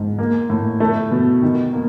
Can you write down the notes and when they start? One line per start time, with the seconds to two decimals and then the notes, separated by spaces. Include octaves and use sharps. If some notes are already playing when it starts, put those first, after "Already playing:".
Already playing: G#2
0.18 A#3
0.50 A2
0.80 A3
1.11 B2
1.42 D#3
1.73 A#3